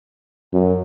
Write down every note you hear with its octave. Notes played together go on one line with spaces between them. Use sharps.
F#2